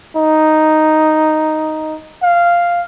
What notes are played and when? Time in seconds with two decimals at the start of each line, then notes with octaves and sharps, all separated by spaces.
0.17 D#4
2.23 F5